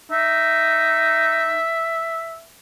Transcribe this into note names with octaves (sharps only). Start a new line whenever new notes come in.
D#4 E5